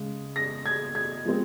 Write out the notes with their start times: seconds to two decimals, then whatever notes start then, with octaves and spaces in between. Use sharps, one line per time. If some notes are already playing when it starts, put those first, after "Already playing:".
Already playing: C#3 G#3
0.36 A#6
0.66 G#6
0.95 G#6
1.25 F3 G#3 C4